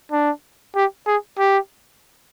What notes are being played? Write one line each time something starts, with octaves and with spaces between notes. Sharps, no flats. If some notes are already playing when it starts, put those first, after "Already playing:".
D4
G4
G#4
G4